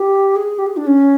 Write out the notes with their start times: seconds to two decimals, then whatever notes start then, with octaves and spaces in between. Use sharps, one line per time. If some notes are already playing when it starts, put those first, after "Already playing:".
Already playing: G4
0.36 G#4
0.59 G4
0.66 G#4
0.77 D4
0.87 C#4